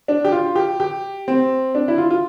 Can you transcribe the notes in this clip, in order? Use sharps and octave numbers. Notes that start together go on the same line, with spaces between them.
D4
G4
F4
G4
G4
C4
D4
E4
F4
F4